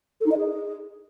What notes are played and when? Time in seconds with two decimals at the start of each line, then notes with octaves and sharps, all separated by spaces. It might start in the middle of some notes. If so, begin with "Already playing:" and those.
0.20 A4
0.26 D#4
0.31 D#5
0.37 G#4